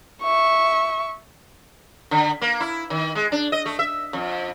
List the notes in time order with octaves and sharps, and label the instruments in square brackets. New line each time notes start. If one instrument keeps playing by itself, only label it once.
[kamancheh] E5 C#6
[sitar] D3
A#3
E4
D#3
G#3
D4
D#5
A3
E5
F2